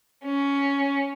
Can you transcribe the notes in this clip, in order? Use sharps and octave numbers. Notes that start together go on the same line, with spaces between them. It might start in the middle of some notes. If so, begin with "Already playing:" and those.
C#4